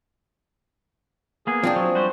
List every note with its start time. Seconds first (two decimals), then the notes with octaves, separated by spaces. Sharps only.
1.47 A#3 B3 G#4
1.63 F3 C4 D4
1.76 F#3
1.95 G3 F#4 C5